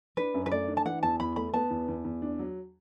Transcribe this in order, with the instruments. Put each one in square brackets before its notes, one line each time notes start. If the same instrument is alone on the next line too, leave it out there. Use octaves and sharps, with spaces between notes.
[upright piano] D4 [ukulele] B4
[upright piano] F#2
[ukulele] B4
[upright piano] A3 [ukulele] D5
[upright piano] D4
[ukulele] A5
[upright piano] E3 [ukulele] F#5
[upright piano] E2 [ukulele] A5
[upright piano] E2 [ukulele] B5
[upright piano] A3 [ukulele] B5
[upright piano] B3 [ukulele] A5
[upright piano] E2
E2
E2
D4
F#3